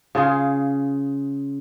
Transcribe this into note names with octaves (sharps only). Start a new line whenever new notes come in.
C#3 F4 G#4